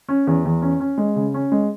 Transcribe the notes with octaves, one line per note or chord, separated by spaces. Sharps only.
C#4
E2
E2
C#4
C#4
G#3
C#3
C#4
G#3